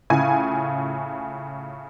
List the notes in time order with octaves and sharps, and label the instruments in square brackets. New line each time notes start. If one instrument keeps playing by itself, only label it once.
[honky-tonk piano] A2 C#3 F4 G#5